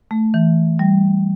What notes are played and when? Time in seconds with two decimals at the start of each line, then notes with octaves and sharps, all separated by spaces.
0.11 A3
0.34 E3
0.79 G3